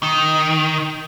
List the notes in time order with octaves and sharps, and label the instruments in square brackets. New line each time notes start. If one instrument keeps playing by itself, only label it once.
[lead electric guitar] D#3